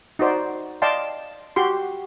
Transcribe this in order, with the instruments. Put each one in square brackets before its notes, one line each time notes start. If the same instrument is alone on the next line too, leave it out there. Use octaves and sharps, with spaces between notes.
[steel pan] D#4 F#4 C5 D5
D5 D#5 F5 G5 A5 C6
F#4 G4 C6